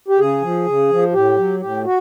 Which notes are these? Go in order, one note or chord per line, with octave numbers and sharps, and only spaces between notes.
G4
C#3 G#4
F3
C#3
F3
A2 G4
F#3
A2 G4
F#4